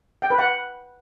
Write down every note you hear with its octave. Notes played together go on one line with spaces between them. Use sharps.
G5
B4
F#5